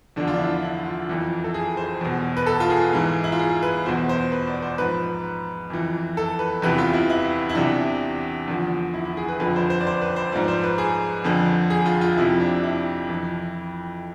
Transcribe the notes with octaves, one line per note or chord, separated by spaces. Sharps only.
E2 D3 F3 D4
F4
D4
E4
D4
E4
F4
F2 E3
A4
G#4
C5
E2 B2
B4
A4
F4
G#4
G#2 E3
E4
F4
G#4
B4
E2 B2 C5
C5
B4
D5
C5
G#2 F3 B4
F2 E3
A4
B4
E2 C3 E3 B4
F4
E4
E4
E4
E2 C3 E3 D4
E2 D3 F3
E4
E4
G#4
B4
F2 D3 F3 B4
C5
C5
D5
C5
B4
C5
G#2 F3 D5
C5
B4
G#4
F2 D3 F3
G#4
F4
F4
F2 C3 F3 E4
D4
E4
F2 E3